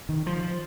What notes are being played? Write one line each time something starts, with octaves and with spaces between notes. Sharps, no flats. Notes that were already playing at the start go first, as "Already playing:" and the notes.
D#3
F3